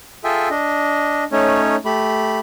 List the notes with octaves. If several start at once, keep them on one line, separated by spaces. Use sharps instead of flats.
F4 G#4 A4 E5 G5 G#5
D4 D#5
A3 C#4 D#4 C#5
A3 G4 B5